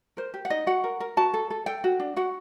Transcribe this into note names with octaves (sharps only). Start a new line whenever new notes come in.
A#4 C5
G4
F#5
D#4 D#5
F#4 F#5
A#4
A#4
F#4 A5
A4
A4
A4 G5
F#4
D4
F#4 F#5